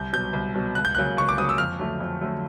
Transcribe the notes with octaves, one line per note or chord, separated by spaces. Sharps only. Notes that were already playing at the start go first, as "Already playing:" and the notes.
Already playing: C2 G6
B2 F#3 G6
C2
B2 F#3
C#2 F#6
G6
C#3 F#3 A#3 F#6
C#2 C#6
D6
C#3 F#3 A#3 D#6
E6
F2 F6
D3 F#3 A3
F2
D3 F#3 A3